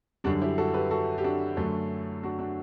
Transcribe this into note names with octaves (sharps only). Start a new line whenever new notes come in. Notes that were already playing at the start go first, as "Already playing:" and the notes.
F#2 D3 G3 D4 F#4
E4 G4
F#4 A4
G4 B4
F#4 A4
G4
D4 F#4
F#2 D3 F#3 A3
D4 F#4
D4 F#4